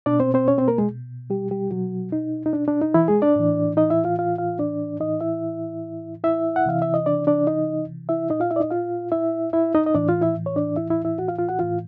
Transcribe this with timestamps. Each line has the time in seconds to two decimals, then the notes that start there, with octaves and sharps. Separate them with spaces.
0.06 B2 D4 D5
0.20 C4 C5
0.34 C4 C5
0.48 C#4 C#5
0.58 C4 C5
0.68 A#3 A#4
0.78 G#3 G#4
1.30 G3 G4
1.51 G3 G4
1.71 B2 F#3 F#4
2.12 D#4
2.46 D#4
2.53 D4
2.68 D4
2.81 D#4
2.94 E3 E4
3.08 G#3 G#4
3.22 D4 D5
3.36 A2 E3
3.77 D#4 D#5
3.90 E4 E5
4.04 F4 F5
4.19 F4 F5
4.38 F4 F5
4.59 D4 D5
5.00 A2 E3 D#4 D#5
5.21 E4 E5
6.24 E4 E5
6.56 F#5
6.66 C3 E3 F5
6.82 E5
6.94 D#5
7.06 D4 D5
7.27 D4 D5
7.47 D#4 D#5
8.09 E4 E5
8.30 A#2 D#4 D#5
8.40 F4 F5
8.51 E4 E5
8.56 D5
8.60 D#4 D#5
8.71 F4 F5
9.12 E4 E5
9.53 E4 E5
9.75 D#4 D#5
9.86 D#5
9.94 A2 E3 D4 D5
10.09 F4 F5
10.22 E4 E5
10.46 C#5
10.56 D4 D5
10.76 E4 E5
10.90 E4 E5
11.05 E4 E5
11.18 F#4 F#5
11.28 F4 F5
11.38 F4 F5
11.49 F#4 F#5
11.59 A2 E3 F4 F5